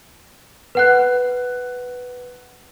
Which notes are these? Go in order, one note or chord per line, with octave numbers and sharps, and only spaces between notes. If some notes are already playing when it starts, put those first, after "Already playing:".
B4 F#5 F#6